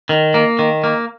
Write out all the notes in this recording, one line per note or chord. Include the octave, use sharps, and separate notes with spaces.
D#3
A#3
D#3
A#3